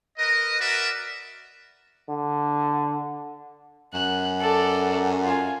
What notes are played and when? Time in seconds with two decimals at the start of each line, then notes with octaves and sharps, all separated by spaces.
0.18 A#4 B4 D#5
0.59 F#4 A#4 B4 D5 E5
2.09 D3
3.94 F#2 F#6
4.41 A4 D5
5.24 F4 G#5